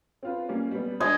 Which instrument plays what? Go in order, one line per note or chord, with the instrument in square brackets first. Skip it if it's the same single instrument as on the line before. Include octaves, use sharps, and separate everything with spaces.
[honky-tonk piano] C4 F4 B4
G3 A#3 C#4
G3 B3
[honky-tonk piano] G#3 D4 [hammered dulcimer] D#5 G#5